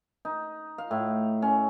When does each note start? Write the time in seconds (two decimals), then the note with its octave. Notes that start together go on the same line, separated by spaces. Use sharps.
0.25 D#4
0.78 F5
0.91 A2
1.42 C#4